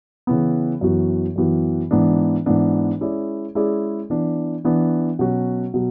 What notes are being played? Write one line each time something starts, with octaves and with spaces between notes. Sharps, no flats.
C#3 E3 B3
F#2 E3 B3 F#4
F#2 E3 B3 F#4
G#2 E3 B3 D4
G#2 E3 B3 D4
G#3 C#4 E4 G#4 D5
G#3 C#4 E4 G#4 D5
E3 B3 D4
E3 B3 D4
B2 F#3 C#4 F#4
B2 F#3